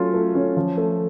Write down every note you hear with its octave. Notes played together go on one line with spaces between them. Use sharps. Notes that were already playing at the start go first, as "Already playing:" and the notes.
Already playing: F#3 A3 C#4 F4
A3
C#4
F3
A3